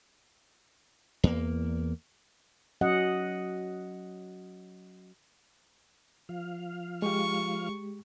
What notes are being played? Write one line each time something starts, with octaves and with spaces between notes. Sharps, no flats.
E2 A#3
F#3 C#4 D#5 F#5
F3 F5
G#3 G4 C#6